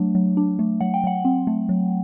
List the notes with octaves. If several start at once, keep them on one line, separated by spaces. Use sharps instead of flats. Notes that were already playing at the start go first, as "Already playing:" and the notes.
Already playing: F#3 A3 D4
F#3
D4
A3
F#3 F#5
G5
F#3 F#5
C4
A3
F#3